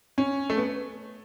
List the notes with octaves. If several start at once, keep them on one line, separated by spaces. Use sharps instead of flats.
C#4
A3
B3